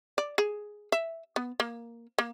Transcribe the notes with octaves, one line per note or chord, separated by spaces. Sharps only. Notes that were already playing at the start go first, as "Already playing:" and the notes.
D5
G#4
E5
B3
A#3
A#3